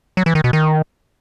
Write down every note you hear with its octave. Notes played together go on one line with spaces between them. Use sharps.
F#3
E3
D#3
B2
D#3